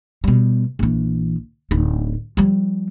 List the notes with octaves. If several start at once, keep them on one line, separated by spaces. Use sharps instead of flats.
B2 G3
A#1 E3
D1 D#4
F3 G3